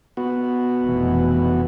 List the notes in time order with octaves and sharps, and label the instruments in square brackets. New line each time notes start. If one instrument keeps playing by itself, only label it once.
[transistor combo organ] B3 F#4
[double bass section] F1 B2 E3